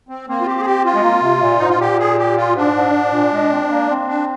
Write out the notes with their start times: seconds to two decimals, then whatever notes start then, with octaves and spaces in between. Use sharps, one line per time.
0.09 C4
0.28 A#3 C4
0.41 F4
0.46 G4
0.61 G#4
0.65 G4
0.85 F4
0.95 G#3
1.03 A#3
1.23 C3
1.42 A#2
1.59 G#2 D#4
1.69 F4
1.80 A#2 G4
1.99 G#4
2.18 G4
2.37 F4
2.56 G#2 D4
2.75 G#2
2.94 G#2
3.13 A#2
3.33 G#3
3.52 C4
3.71 A#3
3.90 C4
4.08 D4